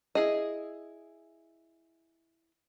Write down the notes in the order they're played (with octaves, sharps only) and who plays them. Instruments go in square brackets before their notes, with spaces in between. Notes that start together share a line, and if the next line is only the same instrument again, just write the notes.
[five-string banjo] E4 G#4 D#5